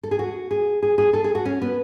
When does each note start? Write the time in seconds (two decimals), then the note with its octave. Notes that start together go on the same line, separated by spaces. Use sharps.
0.03 A4
0.11 G#4
0.19 F#4
0.51 G#4
0.82 G#4
0.98 G#4
1.13 A4
1.24 G#4
1.35 F#4
1.45 C#4
1.62 B3